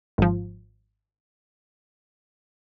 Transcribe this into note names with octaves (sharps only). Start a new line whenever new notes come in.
G#1 F3